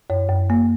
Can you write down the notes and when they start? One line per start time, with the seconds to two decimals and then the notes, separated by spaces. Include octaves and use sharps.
0.10 F#2 C#5
0.29 F#2
0.50 A#3